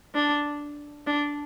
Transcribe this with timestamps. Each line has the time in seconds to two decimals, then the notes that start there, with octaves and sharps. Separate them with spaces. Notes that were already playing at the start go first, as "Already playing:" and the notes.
0.15 D4
1.07 D4